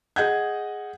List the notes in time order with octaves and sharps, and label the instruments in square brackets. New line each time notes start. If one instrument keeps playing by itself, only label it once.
[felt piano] G#4 D#5 F#5 G6 G#6